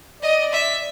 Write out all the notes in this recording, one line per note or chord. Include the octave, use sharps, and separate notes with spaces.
D5 D#5
E5